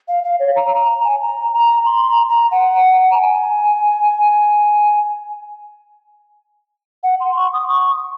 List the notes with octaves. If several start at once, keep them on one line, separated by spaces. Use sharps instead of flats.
F5
F5
C#5
A#5
A#5
A#5
G#5
A#5
A#5
C6
A#5
A#5
F#5
A#5
G#5
F#5
C6
C#6
D#6
C#6